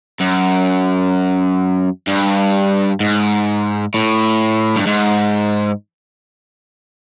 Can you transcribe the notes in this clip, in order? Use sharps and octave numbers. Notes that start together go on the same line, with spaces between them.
F#2
G2
G#2
A2
G2
G#2